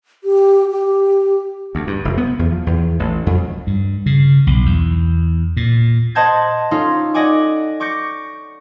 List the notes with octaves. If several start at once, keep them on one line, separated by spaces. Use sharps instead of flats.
G4
G4
D2
G2
F1
B3
E2
F3
E2
A1
F2
G2
C#3
B1
E2
A#2
C5 D#5 F#5 A5 G6 G#6
C#4 D#4 F4 A4
D5 D#5 F#5 G#5 D6
C#6 D6 G6 A#6 C#7